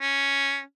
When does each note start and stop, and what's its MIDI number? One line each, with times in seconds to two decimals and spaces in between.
0.01 0.62 61